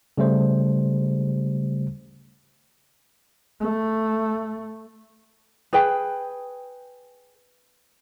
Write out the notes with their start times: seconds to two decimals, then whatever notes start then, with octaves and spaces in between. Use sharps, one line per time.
0.17 C#3 G3 A3 C5
3.60 A3
5.73 G#4 B4 G5